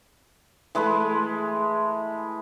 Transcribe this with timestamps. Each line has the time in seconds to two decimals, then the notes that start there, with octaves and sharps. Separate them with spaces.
0.75 E3 G#3 A3 B4